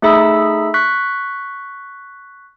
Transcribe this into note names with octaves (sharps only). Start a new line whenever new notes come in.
A3 D#4 G#4 E5 B5 E6
C#6 F#6 B6